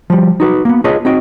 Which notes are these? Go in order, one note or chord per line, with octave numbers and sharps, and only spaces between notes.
F3 G3
D#4 F#4 B4
A#3 B3
D4 F4 G#4 B4 C#5 D#5
C4 D#4 F#4 D#5 G5